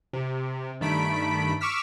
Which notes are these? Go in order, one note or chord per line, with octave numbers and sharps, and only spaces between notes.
C3
G2 D#3 A3 B5 B6 D7
C#6 D6 E6 F6 B6